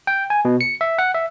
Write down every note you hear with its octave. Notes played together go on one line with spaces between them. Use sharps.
G5
G#5
B2
C#7
E5
F#5
E5